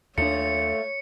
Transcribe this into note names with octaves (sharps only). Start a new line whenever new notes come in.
D#2 A3 D4 F4 C#5 C#7